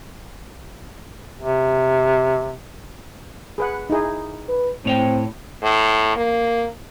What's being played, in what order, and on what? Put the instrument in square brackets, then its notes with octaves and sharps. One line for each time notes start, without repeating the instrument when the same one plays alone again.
[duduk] C3
[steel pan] G#4 B4 F#5
D#4 E4 G#4
[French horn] B4
[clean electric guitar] A2 C#5 G5 [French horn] C4
[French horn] A2
A#3